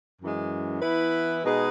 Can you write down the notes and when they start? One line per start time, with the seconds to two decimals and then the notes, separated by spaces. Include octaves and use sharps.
0.21 F#2 E3 G#3
0.82 E3 B3 E4 B4
1.44 B2 G#3 D#4 G#4 B4